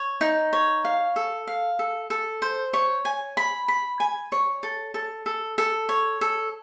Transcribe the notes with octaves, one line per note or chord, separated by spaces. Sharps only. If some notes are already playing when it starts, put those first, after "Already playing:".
Already playing: C#5
D#4
C#5
F5
A4
F5
A4
A4
C5
C#5
G#5
B5
B5
G#5
C#5
A4
A4
A4
A4
C#5
A4